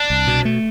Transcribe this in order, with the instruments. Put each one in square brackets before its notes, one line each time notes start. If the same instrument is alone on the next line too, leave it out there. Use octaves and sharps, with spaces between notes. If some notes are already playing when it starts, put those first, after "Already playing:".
Already playing: [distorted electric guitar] D4
[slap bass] C2
B2
A3